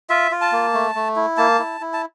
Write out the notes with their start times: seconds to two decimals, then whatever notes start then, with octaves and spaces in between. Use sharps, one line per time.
0.09 F4 E5
0.31 F4
0.41 A5
0.52 A#3
0.74 A3
0.95 A3
1.16 E4
1.37 A#3 A5
1.59 E4
1.81 E4
1.93 A5